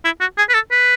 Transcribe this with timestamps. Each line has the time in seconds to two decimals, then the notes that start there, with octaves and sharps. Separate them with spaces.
0.04 E4
0.21 F#4
0.38 G#4
0.49 B4
0.54 A4
0.71 B4